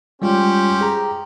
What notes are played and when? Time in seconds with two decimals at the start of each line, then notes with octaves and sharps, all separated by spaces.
0.22 G3 G#3 C#4 F4 G4 C5
0.81 G#4 A#5